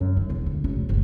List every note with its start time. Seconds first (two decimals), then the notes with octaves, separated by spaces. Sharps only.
0.01 F#2
0.17 D#3
0.29 E1 E2
0.46 D2
0.64 F1 C#4
0.89 F#1 D2